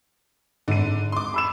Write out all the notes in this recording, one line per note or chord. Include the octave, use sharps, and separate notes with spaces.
G#1 D3 D#7
C6 D6
B5 E6 E7